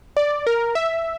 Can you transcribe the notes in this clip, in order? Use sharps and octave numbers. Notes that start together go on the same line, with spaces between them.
D5
A#4
E5